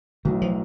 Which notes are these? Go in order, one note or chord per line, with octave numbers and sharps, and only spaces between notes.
B1 A2 D#3 F#3
F3